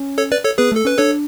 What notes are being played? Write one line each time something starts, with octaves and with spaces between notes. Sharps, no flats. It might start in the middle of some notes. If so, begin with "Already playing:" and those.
Already playing: C#4
A4 C#5
B4 D5
A4 C#5
B3 G#4 B4
A3 A4
C#4 B4
D4 A4 C#5